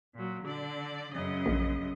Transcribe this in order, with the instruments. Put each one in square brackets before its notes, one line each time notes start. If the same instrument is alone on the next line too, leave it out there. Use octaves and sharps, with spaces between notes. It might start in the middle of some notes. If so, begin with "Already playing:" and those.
[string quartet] A#2 F#3
D3 D5
F#2 C#3 D#5
[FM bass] A#1